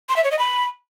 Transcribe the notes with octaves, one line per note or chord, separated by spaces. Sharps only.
C6
E5
C#5
D#5
B5